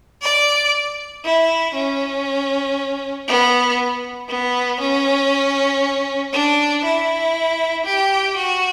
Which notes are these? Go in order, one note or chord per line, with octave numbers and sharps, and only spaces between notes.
D5
E4
C#4
B3
B3
C#4
D4
E4
G4
F#4